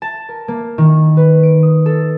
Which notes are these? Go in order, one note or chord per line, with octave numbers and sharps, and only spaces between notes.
A5
A#4
A#3
D#3
B4
D7
D#6
A4